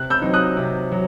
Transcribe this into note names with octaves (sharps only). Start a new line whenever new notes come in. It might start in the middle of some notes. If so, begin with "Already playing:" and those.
Already playing: C3 F#6
E6 G6
F#3 C4 D#4
D#6 F#6
C3
F#3